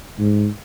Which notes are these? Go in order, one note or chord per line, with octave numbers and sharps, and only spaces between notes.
G#2